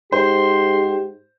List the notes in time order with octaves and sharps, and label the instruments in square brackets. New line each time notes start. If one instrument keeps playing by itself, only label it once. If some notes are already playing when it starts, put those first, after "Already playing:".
[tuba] G#2 [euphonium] G4 [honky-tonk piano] C5 [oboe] C6